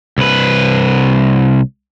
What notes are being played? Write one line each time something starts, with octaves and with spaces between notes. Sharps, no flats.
C2 B4